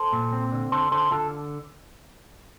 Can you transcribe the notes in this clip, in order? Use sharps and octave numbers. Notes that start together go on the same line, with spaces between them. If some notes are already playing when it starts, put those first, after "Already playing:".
Already playing: A4 C5
A#2
C4
D3
D3 A4 C5
D3 A4 C5
D3 F4 A4